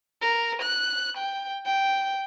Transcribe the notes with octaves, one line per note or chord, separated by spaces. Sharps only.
A#4
F#6
G5
G5